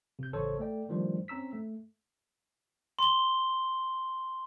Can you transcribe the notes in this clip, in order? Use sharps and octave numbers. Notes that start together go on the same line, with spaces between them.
C3 G6
A1 C#3 A4 C5 C#5
A3 A4 D5 G5
D#3 F3 G3 A3 D4 C5
C4 C#4 A#5 E6 B6
A3
C6 G7